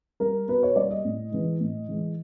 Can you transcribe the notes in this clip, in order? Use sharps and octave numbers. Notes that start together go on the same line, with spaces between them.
G3 A#4
B2 B4
C#5
G3 D5
D#5
A2
E3 G#3
A2
E3 G#3